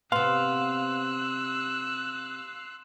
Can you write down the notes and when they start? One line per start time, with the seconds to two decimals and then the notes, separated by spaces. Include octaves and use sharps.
0.12 C3 B3 F5 C6 E6 F#6